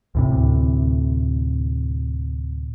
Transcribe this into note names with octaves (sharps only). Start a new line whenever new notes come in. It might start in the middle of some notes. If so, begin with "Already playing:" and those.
D2 A2 C3